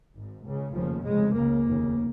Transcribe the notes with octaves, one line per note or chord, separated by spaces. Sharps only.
G#1 G#2
C#2 C#3
F1 D#2 C#3 F3
F1 F2 C#3 G#3
C#2 C#3 A#3
F1 D#2 C#3